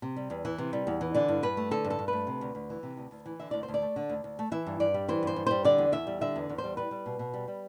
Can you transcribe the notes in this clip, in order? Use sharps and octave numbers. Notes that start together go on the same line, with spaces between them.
C3
G3
E2
E3
C3
G3
E2
E3
D3 D5
G2
G2 B4
A3
D3 A4
G2
A4
G2
A3 B4
C3
D2
D2
E3
C3
D2
D2
E3
D3 E5
D2 D5
C5
D2
D5
A3
D3
D2
D2
A3
E3 E5
G2
G2 D5
G3
E3 C5
G2 C5
G2
G3 C5
D3 D5
E2
E2 E5
G3
D3 E5
E2
E2
C5
G3
G3 B4
G3
B2
B2
G3
G3